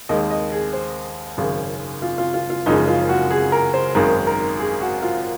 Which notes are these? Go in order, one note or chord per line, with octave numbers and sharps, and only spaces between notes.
D#2 D#3 G#3 D#5
D#5
G#4
C5
G#1 F#2 C#3
F4
F4
F4
F4
F#1 F#2 C#3 F3 G#3 D#4
F4
F#4
G#4
A#4
C5
G#1 F#2 D#3 G#3 A#4
A#4
G#4
F#4
F4